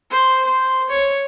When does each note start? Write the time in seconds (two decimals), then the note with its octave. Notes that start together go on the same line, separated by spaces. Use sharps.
0.11 C5
0.45 C5
0.89 C#5